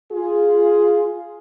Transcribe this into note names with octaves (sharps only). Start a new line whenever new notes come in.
F4 G#4